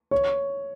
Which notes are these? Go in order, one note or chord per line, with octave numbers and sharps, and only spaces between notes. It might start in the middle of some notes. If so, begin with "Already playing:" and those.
C#5